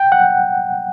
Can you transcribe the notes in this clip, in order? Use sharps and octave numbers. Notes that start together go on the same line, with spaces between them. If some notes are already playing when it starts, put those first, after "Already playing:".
Already playing: G5
F#5